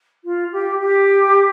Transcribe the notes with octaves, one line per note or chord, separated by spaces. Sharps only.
F4
G4
G4